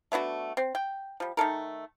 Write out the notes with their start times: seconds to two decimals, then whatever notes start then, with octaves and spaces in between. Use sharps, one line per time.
0.12 A3 B3 D4 F#4
0.57 C4
0.75 G5
1.20 F3 G3
1.37 D#3 A3 A4 A#4